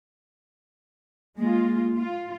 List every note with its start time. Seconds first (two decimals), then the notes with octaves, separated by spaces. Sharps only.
1.37 G#3 A#3 F4
1.97 F4